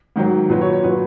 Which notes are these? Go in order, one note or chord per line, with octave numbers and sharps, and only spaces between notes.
G#2 D#3 F#3
A#2 F#3 B4
C#5
C#5
A#2 F#3 B4